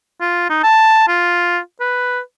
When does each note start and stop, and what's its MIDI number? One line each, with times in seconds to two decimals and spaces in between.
0.20 0.45 65
0.49 0.62 63
0.63 1.07 81
1.08 1.58 65
1.80 2.20 71